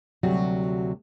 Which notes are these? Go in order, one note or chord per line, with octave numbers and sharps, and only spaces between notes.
D2 C3 F#3 G3 F#4